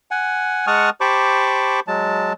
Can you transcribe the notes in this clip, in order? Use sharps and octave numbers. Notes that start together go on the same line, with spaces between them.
F#5 G#5
G#3 F#5 A5 C#6 D#6 F6
G4 C5 A5 B5 C#6 D6
F#3 G#3 A5